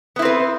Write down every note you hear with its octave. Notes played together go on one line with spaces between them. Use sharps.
B3 C4 E4 B4